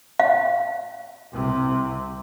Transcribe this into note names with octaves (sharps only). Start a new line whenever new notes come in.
F5
C2 C3